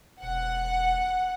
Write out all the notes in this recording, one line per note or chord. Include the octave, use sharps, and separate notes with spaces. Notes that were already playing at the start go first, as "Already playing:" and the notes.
E1 F#5